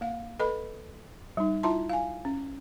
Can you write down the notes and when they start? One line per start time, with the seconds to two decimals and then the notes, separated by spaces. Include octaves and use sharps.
0.01 A#3 F5
0.40 A4 B4 D#5 B5
1.37 G3 D#4
1.63 E4 F4 E5 A5 A#5 C6
1.89 F5 G#5
2.25 C#4